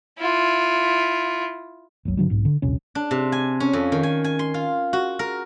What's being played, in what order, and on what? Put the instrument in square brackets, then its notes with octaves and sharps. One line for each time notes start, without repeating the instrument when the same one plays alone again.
[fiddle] E4 F4
[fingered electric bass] F#1 C2 F#3
G2 D3 F#3 G3
B1 G#2
D3
D#1 A#1 C3 C#4
[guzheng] D4
C3
G#5
C#4
F2
D#3
G#5
G#5
C6
F4
F#4
A#4